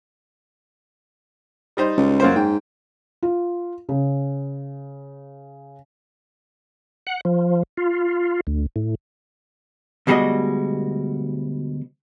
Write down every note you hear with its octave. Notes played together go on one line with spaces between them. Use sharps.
G3 D#4 C5
C#2
F#2 A#3 C5
G#2 G5
F4
C#3
F#5
F3
F4
D2
A2
D2 B2 G3 G#3 F#4 D#5